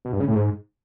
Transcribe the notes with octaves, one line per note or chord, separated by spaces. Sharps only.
B2
G2
C#3
A2
G#2